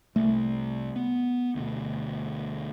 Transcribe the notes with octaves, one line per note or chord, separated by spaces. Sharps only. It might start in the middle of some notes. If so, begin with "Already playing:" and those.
C2 A3
B3
D2 B2